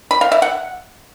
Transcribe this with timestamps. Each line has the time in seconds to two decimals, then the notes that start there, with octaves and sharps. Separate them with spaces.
0.11 B5
0.21 F5
0.32 E5
0.42 F#5